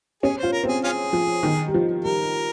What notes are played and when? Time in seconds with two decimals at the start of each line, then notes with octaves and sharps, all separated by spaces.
0.23 C#4 G#4
0.38 F4 C5
0.52 A#4
0.64 C4
0.68 G#4
0.84 C#4 F4 G#4
1.13 F3
1.43 D#3
1.67 G3
1.74 F3
2.04 G3 A#4